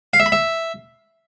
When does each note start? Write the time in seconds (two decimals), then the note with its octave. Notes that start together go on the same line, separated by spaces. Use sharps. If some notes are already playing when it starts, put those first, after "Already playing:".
0.14 F5
0.20 E5
0.26 B5
0.32 E5